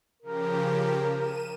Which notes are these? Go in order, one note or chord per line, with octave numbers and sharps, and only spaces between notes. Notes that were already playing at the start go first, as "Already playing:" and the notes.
C#3 F3 G4 A#4
D#7 E7